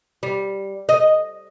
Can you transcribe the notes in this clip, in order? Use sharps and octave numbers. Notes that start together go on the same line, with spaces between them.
G3
D#5